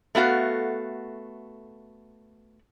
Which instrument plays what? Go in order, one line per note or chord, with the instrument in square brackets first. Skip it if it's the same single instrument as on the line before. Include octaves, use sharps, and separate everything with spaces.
[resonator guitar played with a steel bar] A3 B3 F#4 F5